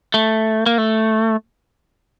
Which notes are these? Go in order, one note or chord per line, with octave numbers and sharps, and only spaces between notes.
A3
A#3
A3